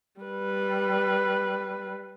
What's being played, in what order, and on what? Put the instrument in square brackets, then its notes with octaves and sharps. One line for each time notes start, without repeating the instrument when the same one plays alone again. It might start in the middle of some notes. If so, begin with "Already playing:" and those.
[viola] G3 B4